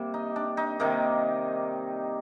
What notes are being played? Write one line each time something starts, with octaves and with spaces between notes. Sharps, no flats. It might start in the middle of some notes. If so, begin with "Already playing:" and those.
Already playing: C3 G3 A#3
D#4
D4
D#4
C3 D#3 A#3 D#4